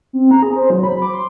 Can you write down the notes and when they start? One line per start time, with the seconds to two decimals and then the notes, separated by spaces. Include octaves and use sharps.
0.13 C4
0.31 A#5
0.42 G#4
0.56 C5
0.70 F#3
0.83 B5
1.02 D6
1.14 C6